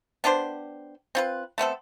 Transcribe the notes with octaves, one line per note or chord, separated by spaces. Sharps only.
B3 D4 G4 C5
C4 F4 B4
A3 B3 C4 A4